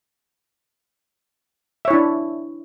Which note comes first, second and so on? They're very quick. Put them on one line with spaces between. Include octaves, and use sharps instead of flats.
E5 C#5 E4 D4